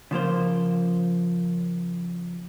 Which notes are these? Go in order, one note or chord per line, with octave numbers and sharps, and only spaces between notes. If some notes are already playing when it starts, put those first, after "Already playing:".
C#3 F3 A#3 C5